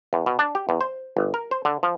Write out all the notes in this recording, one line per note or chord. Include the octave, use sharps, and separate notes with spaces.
E2
B2
D4
G4
E2
C5
G1
A#4
C5
D3
F3